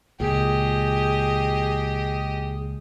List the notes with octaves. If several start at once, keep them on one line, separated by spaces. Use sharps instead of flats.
C#2 A#2 G4 G#4 D#5